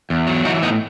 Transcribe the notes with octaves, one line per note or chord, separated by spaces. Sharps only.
E2
F#3
E3 D#4 F#4
A2 B3 D#4